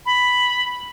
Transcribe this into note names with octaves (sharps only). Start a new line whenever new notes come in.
B5